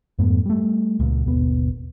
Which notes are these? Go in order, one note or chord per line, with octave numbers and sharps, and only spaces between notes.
F2 G#2 A3 B3
G3 A3
C#2 A#2
G#1 D#2 B2 B3